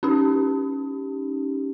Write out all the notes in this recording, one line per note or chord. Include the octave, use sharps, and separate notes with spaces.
C#4 D#4 G4